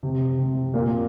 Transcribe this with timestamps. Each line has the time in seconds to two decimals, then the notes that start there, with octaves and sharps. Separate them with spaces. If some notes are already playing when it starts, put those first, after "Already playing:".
0.03 C3
0.39 C3
0.74 A#2